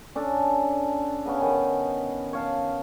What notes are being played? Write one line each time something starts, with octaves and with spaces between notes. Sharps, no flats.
C#4 D4 A4
C#3 B3 C#4
D#3
C#5 F5 A5